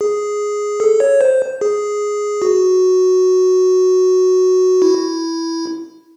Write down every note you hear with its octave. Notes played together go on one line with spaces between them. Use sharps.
G#4
A4
C#5
C5
G#4
F#4
E4